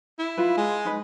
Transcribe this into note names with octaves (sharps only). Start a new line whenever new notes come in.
E4
F4 B4
G#3
D#4 B4